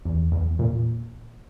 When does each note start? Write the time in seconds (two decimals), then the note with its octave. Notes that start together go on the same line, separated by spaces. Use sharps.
0.05 E2
0.32 E2
0.59 A#2